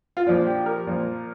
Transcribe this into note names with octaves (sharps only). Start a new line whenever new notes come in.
F4
A#2 F3 A#3 D4
G4
A#4
A#2 F3 A#3